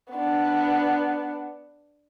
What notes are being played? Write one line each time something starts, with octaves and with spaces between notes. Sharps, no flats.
B3 D4